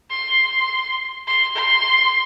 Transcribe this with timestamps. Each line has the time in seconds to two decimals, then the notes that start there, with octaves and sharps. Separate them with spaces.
0.10 C6
1.27 C6
1.56 C6